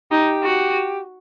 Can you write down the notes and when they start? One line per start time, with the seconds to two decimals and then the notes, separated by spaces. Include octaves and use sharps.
0.11 D#4 G4
0.43 F#4